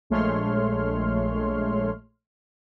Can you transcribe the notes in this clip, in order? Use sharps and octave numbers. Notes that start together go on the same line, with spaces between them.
A#1 G#3 A3 C#5 C6 F6